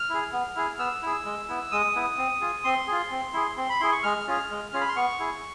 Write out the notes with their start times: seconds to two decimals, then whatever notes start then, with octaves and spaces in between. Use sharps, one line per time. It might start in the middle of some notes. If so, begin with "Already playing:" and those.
Already playing: F6
0.10 E4 G#4
0.33 B3
0.56 E4 G#4
0.79 B3 E6
1.02 E4 G#4
1.25 G#3
1.49 B3 E4
1.72 G#3 D#6
1.95 B3 E4
2.18 C4
2.41 F4 G#4
2.64 C4 C6
2.87 F4 G#4
3.11 C4
3.34 E4 G#4
3.57 C4 C6
3.69 B5
3.80 E4 G#4 C6
3.92 C#6
4.03 G#3 F6
4.27 C#4 F4 G#4
4.51 G#3
4.73 C#4 F4 G#4
4.81 B5
4.89 C6
4.96 B3 C#6
5.20 E4 G#4